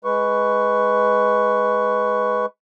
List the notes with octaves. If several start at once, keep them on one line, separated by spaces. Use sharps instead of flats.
G#3 B4 C#6